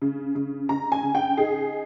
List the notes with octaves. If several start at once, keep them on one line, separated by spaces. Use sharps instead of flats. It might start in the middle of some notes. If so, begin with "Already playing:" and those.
C#3
C#3
C#3 A#5
G#5
C#3
G5
D#4 G#4